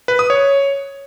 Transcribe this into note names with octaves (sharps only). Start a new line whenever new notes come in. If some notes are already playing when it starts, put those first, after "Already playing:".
B4
D#6
C#5